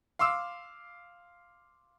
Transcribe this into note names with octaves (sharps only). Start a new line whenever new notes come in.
F5 C6 D6 E6